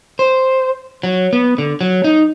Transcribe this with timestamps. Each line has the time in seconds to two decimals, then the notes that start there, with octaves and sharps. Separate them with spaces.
0.19 C5
1.03 F#3
1.33 B3
1.58 D3
1.81 F#3
2.04 D#4